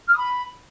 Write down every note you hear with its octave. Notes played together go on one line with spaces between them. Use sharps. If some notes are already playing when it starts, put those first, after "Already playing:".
F6
D#6
B5